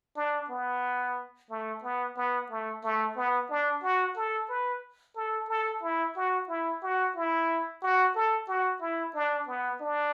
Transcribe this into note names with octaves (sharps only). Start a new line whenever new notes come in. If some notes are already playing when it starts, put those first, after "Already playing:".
D4
B3
A3
B3
B3
A3
A3
B3
D4
F#4
A4
B4
A4
A4
E4
F#4
E4
F#4
E4
F#4
A4
F#4
E4
D4
B3
D4